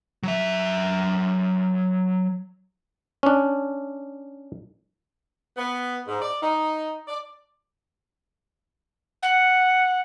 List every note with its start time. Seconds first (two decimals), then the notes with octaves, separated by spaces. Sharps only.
0.23 F#3 E5
3.23 C#4 D4
5.57 B3
6.08 G#2
6.22 D5
6.42 D#4
7.08 D5
9.23 F#5